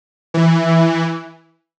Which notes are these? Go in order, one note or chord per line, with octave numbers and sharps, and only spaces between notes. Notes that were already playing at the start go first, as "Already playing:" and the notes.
E3